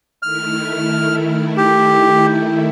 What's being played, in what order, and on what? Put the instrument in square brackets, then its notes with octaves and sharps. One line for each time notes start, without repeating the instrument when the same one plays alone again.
[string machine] D#3 A3 E4 [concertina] F6
[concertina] G4